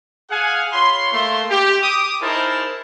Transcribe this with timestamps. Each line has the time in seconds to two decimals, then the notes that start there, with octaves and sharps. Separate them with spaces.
0.31 G#4 F5 F#5 G#5
0.72 F4 C#5 B5 C6
1.12 A3 A#3 C6
1.50 G4
1.82 D6 D#6
2.21 D#4 E4 G#4 A#4 C5 A5